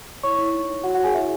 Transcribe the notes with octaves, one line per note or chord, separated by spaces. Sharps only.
E4 C#5 C#6
E4
D#4
D#4
F#4 C#5 F#5
F#4 F#5
C#5
G#4 G#5
E4 E5